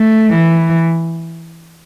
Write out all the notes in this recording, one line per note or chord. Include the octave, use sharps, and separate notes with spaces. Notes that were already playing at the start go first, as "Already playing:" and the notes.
Already playing: A3
E3